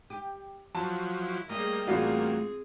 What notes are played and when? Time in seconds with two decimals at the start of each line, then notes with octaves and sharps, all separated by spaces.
0.10 G4
0.75 F3 F#3 A5
1.21 E4
1.49 G3 A3 A#3 C#4 G#4 D#5 E5
1.87 A1 A3 C4 F4 F#4 G#4 D5 E5